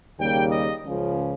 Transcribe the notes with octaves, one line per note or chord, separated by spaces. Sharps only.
D#2 C#3 G3 A#3 G5
D#5
C#2 C#3 F3